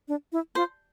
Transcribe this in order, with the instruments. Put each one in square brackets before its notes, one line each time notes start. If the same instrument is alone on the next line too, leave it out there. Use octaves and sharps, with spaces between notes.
[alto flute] D4
E4
[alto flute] F4 [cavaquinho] C5